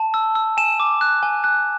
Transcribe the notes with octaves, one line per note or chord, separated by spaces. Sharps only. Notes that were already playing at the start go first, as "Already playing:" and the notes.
Already playing: A5
E6
E6
G#5 E7
D6
F#6
G#5
F#6